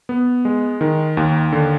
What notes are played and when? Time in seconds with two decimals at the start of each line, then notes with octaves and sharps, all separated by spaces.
0.09 B3
0.45 G#3
0.81 D#3
1.17 D#2
1.52 D3